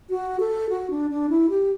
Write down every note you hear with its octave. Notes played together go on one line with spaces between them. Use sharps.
F#4
A4
F#4
D4
D4
E4
G4